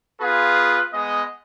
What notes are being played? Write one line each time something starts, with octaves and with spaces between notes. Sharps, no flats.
B3 F4 G#4 B4
G#3 B3 D#5